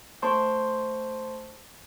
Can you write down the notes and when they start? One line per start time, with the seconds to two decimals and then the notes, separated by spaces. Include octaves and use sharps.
0.22 A3 C5 A5 C6 C#6